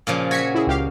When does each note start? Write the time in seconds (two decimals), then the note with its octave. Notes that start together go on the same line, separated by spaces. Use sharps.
0.07 A#2 C#3 F3
0.31 F#4 G#6 B6 C#7
0.55 E4 G#4
0.67 C#2 G4 F5